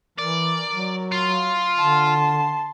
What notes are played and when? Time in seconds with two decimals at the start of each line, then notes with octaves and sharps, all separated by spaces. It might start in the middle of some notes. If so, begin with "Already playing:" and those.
0.18 E3 A#4 D5
0.72 F#3
1.12 F4
1.78 D3 A5 C6